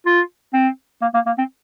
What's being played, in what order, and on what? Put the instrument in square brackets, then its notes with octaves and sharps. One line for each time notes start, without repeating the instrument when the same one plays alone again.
[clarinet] F4
C4
A#3
A#3
A#3
C4